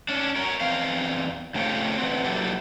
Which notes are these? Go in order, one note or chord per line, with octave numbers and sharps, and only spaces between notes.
C#4 D4
A#4 C#5
E2 C4 F5
C#3 A3 C4 F4 G4 C#5
E2 B3 C4
F#3 A#3 E4 G4 A4 B4